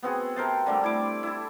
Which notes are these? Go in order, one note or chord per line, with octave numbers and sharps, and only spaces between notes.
B3 C4 F#4 G#4
C3 A#4 C5 A5
D3 G3 A3
E4 D6
E4 A4